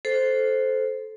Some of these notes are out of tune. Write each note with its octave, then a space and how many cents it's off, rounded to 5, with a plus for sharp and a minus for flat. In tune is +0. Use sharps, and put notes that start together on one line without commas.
A4 -15 C5 +0